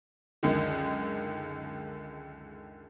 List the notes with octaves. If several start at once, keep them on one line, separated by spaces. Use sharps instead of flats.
C#2 F#2 D3 D#3